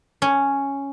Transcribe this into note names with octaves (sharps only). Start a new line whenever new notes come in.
C#4